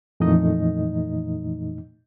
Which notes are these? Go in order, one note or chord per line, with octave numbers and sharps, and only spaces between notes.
F2 A#2 E3 A3 D#4 D#5